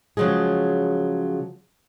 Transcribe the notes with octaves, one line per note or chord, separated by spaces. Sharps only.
C#3 F3 F#3 G#3 G#4